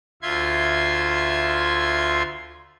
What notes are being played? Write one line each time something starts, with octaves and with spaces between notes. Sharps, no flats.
D2 F4 E5 C6 G#6